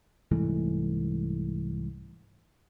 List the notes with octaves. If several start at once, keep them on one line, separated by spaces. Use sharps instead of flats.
C2 G#2 E3 A3